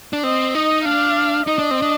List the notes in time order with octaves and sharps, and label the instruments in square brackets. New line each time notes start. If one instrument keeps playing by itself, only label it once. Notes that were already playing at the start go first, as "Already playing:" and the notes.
[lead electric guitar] D4
[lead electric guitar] C4 [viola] D#5
[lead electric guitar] D#4 [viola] D#5
[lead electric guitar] D4 [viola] F5
[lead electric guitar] D#4 [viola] D#5
[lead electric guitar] D4
C4
D4